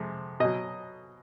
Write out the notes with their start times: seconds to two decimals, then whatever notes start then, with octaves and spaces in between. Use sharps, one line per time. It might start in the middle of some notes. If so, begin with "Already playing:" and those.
Already playing: F2 C3 G#3
0.40 B2 F#3 D#5